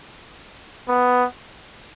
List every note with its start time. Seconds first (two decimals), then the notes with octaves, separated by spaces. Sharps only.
0.88 B3